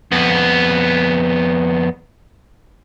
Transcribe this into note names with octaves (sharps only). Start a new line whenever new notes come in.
F2 B3